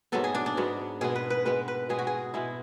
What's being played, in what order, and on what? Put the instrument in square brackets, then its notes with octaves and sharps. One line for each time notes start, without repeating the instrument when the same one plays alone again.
[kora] G#2 F#3 B3 A4
G#4
D4
D4
G#2 F#3 B3
B2 G#3 B3 G#4
B4
B4
B2 G#3 B3 B4
B4
B2 G#3 B3 G#4
F#4
G#4
B2 G#3 B3 E4